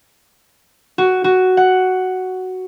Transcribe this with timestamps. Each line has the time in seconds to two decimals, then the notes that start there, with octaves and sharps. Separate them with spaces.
0.98 F#4
1.24 F#4
1.57 F#5